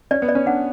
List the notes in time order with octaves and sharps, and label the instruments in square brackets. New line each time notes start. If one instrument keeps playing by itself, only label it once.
[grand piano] C#4 [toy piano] D5
[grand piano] B3
[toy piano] D5
[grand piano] C#4
[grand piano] D4 [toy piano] F#5